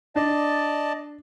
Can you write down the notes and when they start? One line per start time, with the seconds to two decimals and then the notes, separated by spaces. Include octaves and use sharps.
0.16 D4 D5 D#5 A5